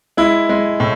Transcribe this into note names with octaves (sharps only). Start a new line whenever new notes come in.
G#3 E4
G#3
A2